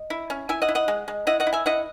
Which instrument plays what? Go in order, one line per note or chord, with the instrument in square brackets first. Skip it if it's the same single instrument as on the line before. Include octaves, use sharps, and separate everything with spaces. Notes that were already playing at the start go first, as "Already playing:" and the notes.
Already playing: [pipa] D#5
E4
C#4
E4 E5 G#5
D#5 F#5
E4
D#5 F#5
G#3
G#3
E4 D#5 F#5
D#5 F#5
E4
E5 G#5
E4 D#5 F#5